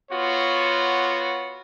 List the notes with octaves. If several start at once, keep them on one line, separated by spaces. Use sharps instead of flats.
B3 F4 F#4 C#5